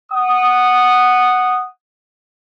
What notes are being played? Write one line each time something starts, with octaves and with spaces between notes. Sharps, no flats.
F#5 D#6